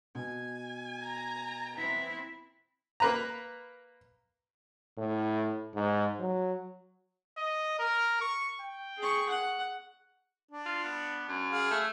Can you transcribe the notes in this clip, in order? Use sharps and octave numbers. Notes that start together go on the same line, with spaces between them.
B2 G#5
A#5
E3 B3 C4 E4
A#3 B4 A#5
A2
G#2
F#3
D#5
A#4
C#6
G5
G#4 C#6
F#5
D4
F4
B3
F#2
G#4 F5
A3